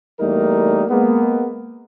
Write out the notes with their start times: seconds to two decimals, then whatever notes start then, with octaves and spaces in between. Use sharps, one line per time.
0.20 E2 G3 A3 A#3 D#4 A#4
0.89 G#3 A#3 B3